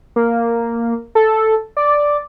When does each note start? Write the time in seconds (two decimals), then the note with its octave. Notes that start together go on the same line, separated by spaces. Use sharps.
0.16 A#3
1.15 A4
1.77 D5